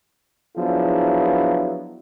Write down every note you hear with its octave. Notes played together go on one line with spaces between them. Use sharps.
F3 F#3 B3 D4 E4 G#4